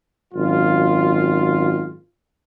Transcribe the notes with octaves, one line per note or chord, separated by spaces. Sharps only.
G#1 F#2 F4